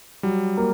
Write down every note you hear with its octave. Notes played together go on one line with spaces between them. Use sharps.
F#3 G3
A#3